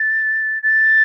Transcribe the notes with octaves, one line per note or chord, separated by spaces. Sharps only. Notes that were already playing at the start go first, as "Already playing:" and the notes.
Already playing: A6
A6